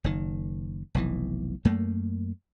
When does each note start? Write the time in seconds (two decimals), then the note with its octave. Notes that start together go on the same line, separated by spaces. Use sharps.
0.04 F#1 D#3
0.95 F1 B1 E3
1.65 F#2 A3 A#3